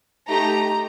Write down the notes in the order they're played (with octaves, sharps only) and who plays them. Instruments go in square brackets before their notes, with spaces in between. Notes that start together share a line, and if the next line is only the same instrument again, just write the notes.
[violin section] A3 D#4 G4 A#5